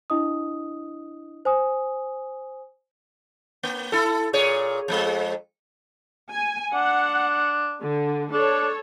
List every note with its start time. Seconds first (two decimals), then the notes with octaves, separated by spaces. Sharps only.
0.10 D4 E4 D#5 D#6
1.45 C5 G#5 D#6
3.63 A#3
3.92 E4 A4
4.33 A#2 G#4 C#5
4.88 F2 G3 G#3
6.30 G#5
6.74 D4 F#5
7.82 D3
8.33 D4 A4 C#5